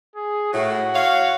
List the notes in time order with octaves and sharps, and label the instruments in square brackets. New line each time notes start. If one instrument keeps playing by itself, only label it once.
[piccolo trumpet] G#4
[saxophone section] A2 [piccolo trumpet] F#4
[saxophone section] C#5 F5